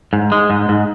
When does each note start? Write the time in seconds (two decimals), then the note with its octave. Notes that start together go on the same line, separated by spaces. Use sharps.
0.13 G#2
0.32 G#3
0.50 G#2
0.69 G#2